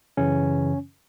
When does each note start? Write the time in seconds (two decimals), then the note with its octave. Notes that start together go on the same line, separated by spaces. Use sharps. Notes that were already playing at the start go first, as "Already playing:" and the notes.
0.17 F#2 C#3 E3 C#4